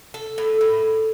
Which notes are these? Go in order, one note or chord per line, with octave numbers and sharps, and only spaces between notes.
A4
A2
A2